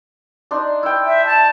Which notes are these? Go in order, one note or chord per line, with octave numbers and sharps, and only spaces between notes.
D4 D#4 C6
E4 G5
E5
A5